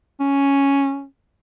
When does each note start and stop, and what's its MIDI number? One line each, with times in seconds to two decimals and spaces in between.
0.20 1.05 61